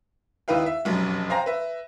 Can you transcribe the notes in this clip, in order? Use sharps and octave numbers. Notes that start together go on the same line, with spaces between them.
D#2 D#4 E4 B4 F5 G5
E5
F1 B1 F#2
C5 F5 G5 G#5 A#5 A#6
B4 E5